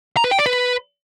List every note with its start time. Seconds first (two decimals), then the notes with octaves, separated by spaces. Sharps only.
0.17 A#5
0.24 B4
0.31 G5
0.39 D5
0.46 B4